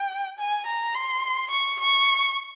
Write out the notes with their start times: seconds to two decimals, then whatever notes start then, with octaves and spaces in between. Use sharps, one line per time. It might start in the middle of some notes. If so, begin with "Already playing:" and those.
Already playing: G5
0.39 G#5
0.66 A#5
0.95 C6
1.51 C#6
1.80 C#6